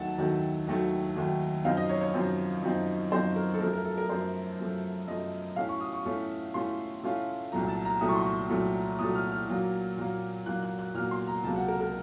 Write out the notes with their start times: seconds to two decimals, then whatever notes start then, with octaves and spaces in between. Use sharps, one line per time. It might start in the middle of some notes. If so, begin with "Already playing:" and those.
Already playing: D#2 D#3 F#3 A3 F#5 A5
0.18 D#2 D#3 F#3 A3
0.67 D#2 D#3 F#3 A3
1.16 D#2 D#3 F#3 A3
1.65 F#2 F3 C4 D#4 F5
1.77 D#5
1.89 C#5
2.01 C#5
2.14 F#2 F3 C4 D#4
2.63 F#2 F3 C4 D#4
3.12 F#2 F3 C4 D#4 C5
3.36 A#4
3.54 A4
3.61 F#2 F3 A3 A#4
3.73 A#4
3.85 A4
3.98 A#4
4.09 F#2 F3 A3 C5
4.59 F#2 F3 A3
5.07 F#2 F3 A3 D#5
5.56 A2 A3 C#4 F4 F5
5.69 C#6
5.81 D#6
5.93 C#6
6.05 A2 A3 C#4 F4
6.54 A2 A3 C#4 F4 C6
7.03 A2 A3 C#4 F4
7.52 C2 A#2 F#3 A3 A#5
7.68 A5
7.85 A#5
8.01 C2 A#2 F#3 A3 D#6
8.09 C#6
8.15 C6
8.22 C#6
8.50 C2 A#2 F#3 A3
8.99 C2 A#2 F#3 A3 D#6
9.15 F6
9.32 F6
9.48 A#2 F#3 A#3
9.97 A#2 F#3 A#3
10.46 A#2 F#3 A#3 F#6
10.63 F#6
10.79 F#6
10.94 A#2 F#3 A#3 F6
11.11 C6
11.27 A#5
11.43 C#2 C3 F#3 A#3 A5
11.56 F#5
11.68 A#4
11.81 A#4